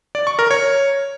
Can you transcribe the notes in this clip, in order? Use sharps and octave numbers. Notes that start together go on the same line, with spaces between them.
D5
C#6
A#4
C#5